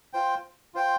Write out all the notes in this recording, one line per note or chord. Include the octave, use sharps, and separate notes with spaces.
F4 C5 G5
F4 C5 G5